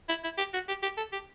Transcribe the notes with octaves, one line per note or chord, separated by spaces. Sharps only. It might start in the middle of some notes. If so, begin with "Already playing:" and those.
E4
E4
G4
F#4
G4
G4
A4
G4